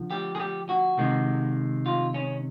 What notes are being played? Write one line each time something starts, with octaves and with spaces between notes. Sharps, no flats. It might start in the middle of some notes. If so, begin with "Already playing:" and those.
Already playing: D3 F3
G4
G#4
G4
F#4
C3 D#3 G#3
F4
C#4